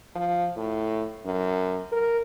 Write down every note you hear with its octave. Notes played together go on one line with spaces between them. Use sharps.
F3
A2
F#2
A#4